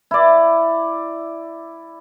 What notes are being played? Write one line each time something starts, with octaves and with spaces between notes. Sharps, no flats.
E4 D5